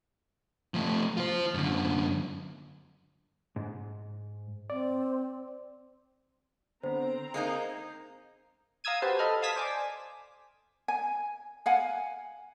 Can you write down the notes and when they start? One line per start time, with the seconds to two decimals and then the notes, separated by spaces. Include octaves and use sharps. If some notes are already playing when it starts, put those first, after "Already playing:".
0.74 F3 A3
1.17 F4 C5
1.54 F#2 D3
3.56 G#2
4.70 C4 D5
6.84 D3 B3 C4 C5 A#5
7.34 G#3 A#3 D#4 G6 C7
8.84 F5 A#5 D#6 E6 G#6 D#7
9.02 F#4 G4 B4 C5 A5
9.19 A4 D#5 B5 F6
9.42 F5 A5 D#6 G#6 B6 E7
9.56 C5 D5 G#5 D6
10.88 G#5
11.66 F5 F#5 G#5